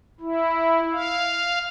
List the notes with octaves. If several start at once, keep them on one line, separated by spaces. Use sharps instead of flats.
E4
F5